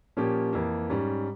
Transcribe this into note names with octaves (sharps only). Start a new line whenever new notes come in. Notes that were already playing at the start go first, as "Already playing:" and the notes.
A#2 F3 A#3 C#4 G4
F2 E3 A#3
G#2 G3 C#4